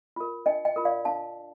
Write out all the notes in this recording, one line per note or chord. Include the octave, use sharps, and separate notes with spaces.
F4 A#4
D4 D#5 G5
D#5 G5
F4 A#4
D5 F5
D4 F5 A5